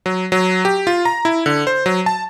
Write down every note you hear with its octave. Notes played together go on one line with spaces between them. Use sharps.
F#3
F#3
G4
F4
A#5
E4
D3
C5
F#3
A5